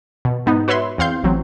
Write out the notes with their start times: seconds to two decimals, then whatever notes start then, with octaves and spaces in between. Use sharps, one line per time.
0.25 B2
0.46 G#2 B3 D#4
0.68 F#4 B4 C#5 E5 B5 C6
0.98 E2 C4 F5 C6 G6
1.23 A1 F#3 C4